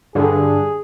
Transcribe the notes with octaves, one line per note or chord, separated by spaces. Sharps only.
G2 D3 G#4